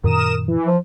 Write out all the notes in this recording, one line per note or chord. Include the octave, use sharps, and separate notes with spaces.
F#2 A#2 D#3 A#4 D#6 E7
E3
F3